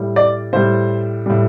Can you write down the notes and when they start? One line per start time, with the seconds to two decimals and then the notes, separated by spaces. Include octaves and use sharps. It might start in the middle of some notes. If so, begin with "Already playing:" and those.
Already playing: A2 G3
0.16 D5
0.53 A2 G3 C5
1.26 A2 G3